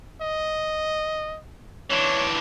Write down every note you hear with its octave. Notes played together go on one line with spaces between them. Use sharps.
D#5
E3 D4 C#5